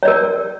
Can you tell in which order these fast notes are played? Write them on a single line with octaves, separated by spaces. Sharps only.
C#5 D5 A#4